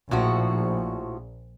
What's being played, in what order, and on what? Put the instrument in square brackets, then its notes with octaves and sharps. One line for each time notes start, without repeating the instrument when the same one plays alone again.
[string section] A#1 [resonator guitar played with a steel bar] A2 F3 F#4